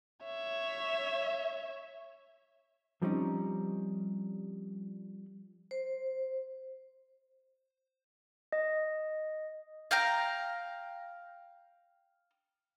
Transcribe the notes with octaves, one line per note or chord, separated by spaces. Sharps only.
C#5 E5
F3 G3 C4 C#4 D#4
C5
D#5
F5 G5 A#5